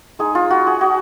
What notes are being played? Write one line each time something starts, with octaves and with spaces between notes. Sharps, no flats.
G#3 D#4 G#4
F4
F#4
G#4
F#4